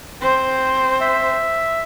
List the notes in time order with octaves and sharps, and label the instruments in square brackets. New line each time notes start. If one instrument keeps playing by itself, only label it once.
[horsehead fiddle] C4 C5
[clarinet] E5